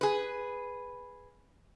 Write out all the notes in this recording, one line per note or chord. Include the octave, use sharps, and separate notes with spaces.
G#4 B4